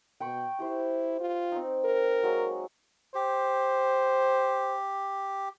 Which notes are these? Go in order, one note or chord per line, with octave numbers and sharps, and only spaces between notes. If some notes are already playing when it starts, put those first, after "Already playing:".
B2 G5 B5 C#6
E4 G4 C5
F4
C4 D#4
A#4
F#3 G#3 A#3
G4 C5